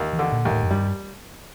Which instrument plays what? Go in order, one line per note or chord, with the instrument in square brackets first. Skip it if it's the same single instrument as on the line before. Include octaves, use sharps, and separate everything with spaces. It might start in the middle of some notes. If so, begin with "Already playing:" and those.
Already playing: [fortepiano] D#2
[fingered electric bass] E3
[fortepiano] D3
[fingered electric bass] A#2
[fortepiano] D#2
[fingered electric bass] A2
F#2
[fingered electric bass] G2 [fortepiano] G3